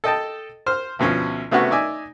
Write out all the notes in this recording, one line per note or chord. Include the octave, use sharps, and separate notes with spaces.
A4 D#5 G5 A5
C5 F6
D2 B2 F3 C#4
C3 A3 B3 C#4 F#4
D#4 D5 E5 G#5